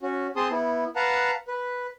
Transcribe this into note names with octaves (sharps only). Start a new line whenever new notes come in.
C#4 F#4
C4 G#4 A5 C6 D#6
B3 E4
B4 F5 F#5 A5 A#5
B4